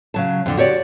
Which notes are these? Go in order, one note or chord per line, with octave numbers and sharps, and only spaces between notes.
C#3 F#3 A5
F2 D3
F#4 G4 C#5 D5